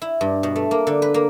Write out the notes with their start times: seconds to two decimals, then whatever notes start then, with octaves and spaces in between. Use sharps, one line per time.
0.02 E4
0.21 G2
0.43 B2
0.56 A3
0.71 A#3
0.87 D3
1.02 B4
1.14 A#3